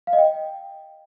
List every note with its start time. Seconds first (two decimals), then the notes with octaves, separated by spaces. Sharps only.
0.07 F5
0.13 D#5
0.18 G5